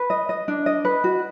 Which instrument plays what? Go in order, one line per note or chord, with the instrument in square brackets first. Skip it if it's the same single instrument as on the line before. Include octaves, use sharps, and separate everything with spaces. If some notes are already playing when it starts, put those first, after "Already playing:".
Already playing: [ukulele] B4
D#5
D#5
D4
D#5
B4
F#4